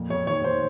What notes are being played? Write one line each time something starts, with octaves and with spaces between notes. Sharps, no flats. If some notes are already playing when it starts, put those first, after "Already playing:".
Already playing: F2 A#2
F2 C#5
D#3 C#5
D#3 C5